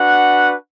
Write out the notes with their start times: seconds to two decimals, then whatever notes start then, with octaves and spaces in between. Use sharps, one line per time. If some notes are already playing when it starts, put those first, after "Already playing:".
Already playing: D4 F#4 B4 F#5